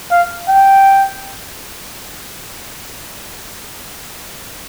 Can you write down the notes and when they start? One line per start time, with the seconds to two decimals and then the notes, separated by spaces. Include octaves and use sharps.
0.11 F5
0.49 G5